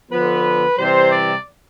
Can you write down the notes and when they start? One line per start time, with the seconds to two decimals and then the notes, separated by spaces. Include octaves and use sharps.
0.11 D3 F3 B3 B4
0.78 C3 E3 G3 C5
1.12 D5